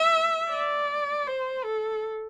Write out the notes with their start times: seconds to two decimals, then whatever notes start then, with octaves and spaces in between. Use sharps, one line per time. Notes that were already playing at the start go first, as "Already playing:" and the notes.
Already playing: E5
0.50 D5
1.27 C5
1.64 A4